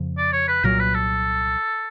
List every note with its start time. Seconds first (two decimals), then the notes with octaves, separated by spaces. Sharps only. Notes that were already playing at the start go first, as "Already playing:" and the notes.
Already playing: F2 C#3 F3
0.18 D5
0.33 C#5
0.48 B4
0.64 C2 A#2 F#3 A#4
0.79 B4
0.94 A4